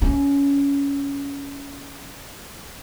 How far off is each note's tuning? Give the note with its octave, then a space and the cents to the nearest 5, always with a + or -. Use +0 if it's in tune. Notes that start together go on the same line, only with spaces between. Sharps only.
C#4 +20